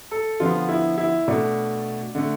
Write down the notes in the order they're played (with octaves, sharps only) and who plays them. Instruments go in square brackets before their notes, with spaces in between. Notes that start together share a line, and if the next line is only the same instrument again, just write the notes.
[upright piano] A4
D3 F3 B3 F4
E4
E4
B2 A3 D4
D3 A3